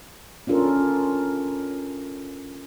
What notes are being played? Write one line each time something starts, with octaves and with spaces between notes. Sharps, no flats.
C#4 D4 F4 A4 A#4